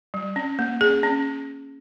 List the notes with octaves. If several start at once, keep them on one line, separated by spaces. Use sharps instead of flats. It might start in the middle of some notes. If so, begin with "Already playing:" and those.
G3
C#4
A#3
C#4 G#4
C#4